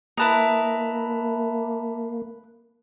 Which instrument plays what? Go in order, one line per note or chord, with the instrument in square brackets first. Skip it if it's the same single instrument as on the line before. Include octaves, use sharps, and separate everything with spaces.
[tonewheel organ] A#3 [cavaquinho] E4 B4 D#5 [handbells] E5 A5 A#5